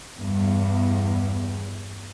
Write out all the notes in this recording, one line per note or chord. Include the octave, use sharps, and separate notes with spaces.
E2 G2